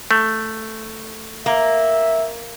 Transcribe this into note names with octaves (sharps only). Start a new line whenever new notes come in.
A3
A#3 E5